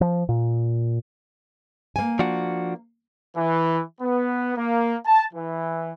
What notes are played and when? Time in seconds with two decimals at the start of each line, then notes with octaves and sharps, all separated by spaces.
0.01 F3
0.29 A#2
1.96 A#3 G#5
2.19 F3 D4 F#4
3.35 E3
4.01 B3
4.56 A#3
5.05 A5
5.34 E3